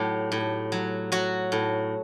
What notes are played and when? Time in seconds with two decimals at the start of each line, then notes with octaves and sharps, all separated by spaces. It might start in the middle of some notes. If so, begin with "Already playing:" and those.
Already playing: A2 F#3 G4
0.32 A2
0.72 F#3
1.12 F#3 F#4
1.52 A2